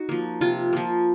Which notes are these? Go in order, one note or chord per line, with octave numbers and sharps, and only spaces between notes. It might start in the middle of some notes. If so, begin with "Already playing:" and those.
Already playing: D#4 F#4
F3 A#3
C3 F4
F3 A#3